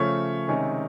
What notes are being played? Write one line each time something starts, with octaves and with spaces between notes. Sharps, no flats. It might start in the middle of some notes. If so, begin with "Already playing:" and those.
Already playing: C#3 F3 A3 C#5
C3 D#3 G#3 C#4